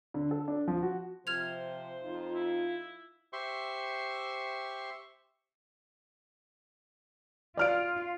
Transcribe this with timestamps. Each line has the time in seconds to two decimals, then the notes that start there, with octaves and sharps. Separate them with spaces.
0.14 D3
0.31 A4
0.48 D4
0.68 F3
0.83 F#4
1.27 C3 F3 C5 F6 G#6 F7
2.03 F2 D#4 F4
2.35 E4
3.33 G4 C5 E5 C6 C#6
7.57 F4 D5 F6 D7